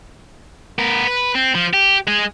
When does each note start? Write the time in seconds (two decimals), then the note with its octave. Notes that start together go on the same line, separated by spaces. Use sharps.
0.79 B3 A#4
1.07 B4
1.35 C4
1.55 F3
1.73 G4
2.07 G#3 G#4